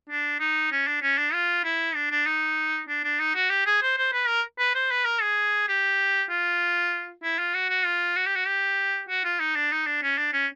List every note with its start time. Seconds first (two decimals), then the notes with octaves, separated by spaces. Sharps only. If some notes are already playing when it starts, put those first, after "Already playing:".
0.09 D4
0.40 D#4
0.71 C#4
0.87 D4
1.02 C#4
1.18 D4
1.33 F4
1.64 E4
1.95 D4
2.11 D4
2.26 D#4
2.88 D4
3.04 D4
3.19 D#4
3.35 F#4
3.50 G4
3.66 G#4
3.82 C5
3.97 C5
4.13 B4
4.27 A#4
4.59 B4
4.75 C5
4.91 B4
5.05 A#4
5.21 G#4
5.68 G4
6.29 F4
7.23 E4
7.38 F4
7.54 F#4
7.70 F#4
7.85 F4
8.16 F#4
8.26 G4
8.36 F#4
8.47 G4
9.09 F#4
9.24 F4
9.39 D#4
9.55 D4
9.72 D#4
9.86 D4
10.02 C#4
10.18 D4
10.33 C#4